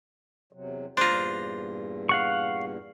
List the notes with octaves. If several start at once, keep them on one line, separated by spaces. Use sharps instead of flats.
E2 C3 F#3
E2 G2 A#2 D4 F4 C5 A#5
F5 F#5 C#6